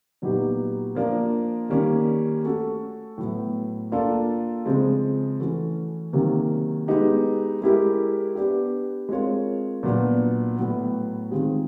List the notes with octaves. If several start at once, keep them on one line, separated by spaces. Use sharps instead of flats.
A#2 F#3 B3 D#4 G4
F3 A#3 D4 F4
D#3 G3 A#3 C#4
A3 C#4 F#4 A4
A2 F#3 B3
A#3 D4 F4 A4
C#3 F3 G#3 C4
E3 A3 C#4 F#4
C3 D#3 F#3 A#3 C#4
G#3 B3 D#4 G4
G#3 C#4 E4 G4 A#4
B3 D4 G4
G#3 C4 F4 A#4 C#5
A#2 F#3 B3 D4
A2 F#3 B3
D#3 G#3 C4 F4 G#4